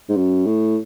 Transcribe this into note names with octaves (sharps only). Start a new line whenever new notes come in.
G#2
F#2
A2